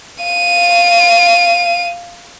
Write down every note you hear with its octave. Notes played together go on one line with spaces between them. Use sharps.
F5 D#7